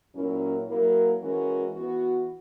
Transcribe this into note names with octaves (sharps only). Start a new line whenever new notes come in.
A#2 F#3 C#4 E4 A#4
F#3 A#3 E4 A#4
E3 G#3 C#4 F#4 A#4
E3 B3 F#4